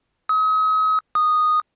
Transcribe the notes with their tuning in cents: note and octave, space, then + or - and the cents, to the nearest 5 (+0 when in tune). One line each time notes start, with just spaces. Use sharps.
D#6 +40
D#6 -10